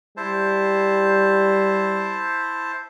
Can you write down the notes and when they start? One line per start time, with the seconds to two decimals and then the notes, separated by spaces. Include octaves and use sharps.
0.17 G3 E4 C5 A5